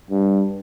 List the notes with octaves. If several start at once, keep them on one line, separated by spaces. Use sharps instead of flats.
G2